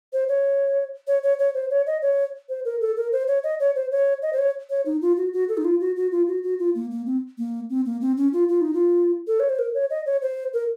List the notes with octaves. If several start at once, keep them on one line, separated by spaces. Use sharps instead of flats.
C5
C#5
C#5
C#5
C#5
C5
C#5
D#5
C#5
C5
A#4
A4
A#4
C5
C#5
D#5
C#5
C5
C#5
D#5
C5
C#5
C#5
D#4
F4
F#4
F#4
A4
D#4
F4
F#4
F#4
F4
F#4
F#4
F4
A#3
A#3
C4
A#3
C4
A#3
C4
C#4
F4
F4
D#4
F4
A4
C#5
C5
A#4
C#5
D#5
C#5
C5
A#4